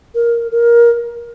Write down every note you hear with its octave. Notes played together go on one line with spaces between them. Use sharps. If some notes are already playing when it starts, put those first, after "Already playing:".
A#4
A#4